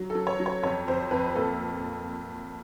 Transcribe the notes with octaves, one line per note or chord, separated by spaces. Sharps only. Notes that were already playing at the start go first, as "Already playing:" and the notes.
Already playing: F#3
A4
F#3
C#5
F#3
C#5
F2 C#5
F2 C5
F2 B4
A#2 A4